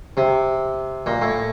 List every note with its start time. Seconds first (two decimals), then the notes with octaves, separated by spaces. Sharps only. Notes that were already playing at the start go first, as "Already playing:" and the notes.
0.17 C3
1.06 A#2
1.22 A2